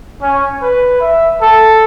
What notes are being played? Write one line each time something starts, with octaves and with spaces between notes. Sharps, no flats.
C#4
B4
E5
A4